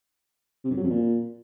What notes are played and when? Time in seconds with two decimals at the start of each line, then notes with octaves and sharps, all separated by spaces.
0.65 C3
0.71 F#2
0.77 F#3
0.84 F2
0.90 A#2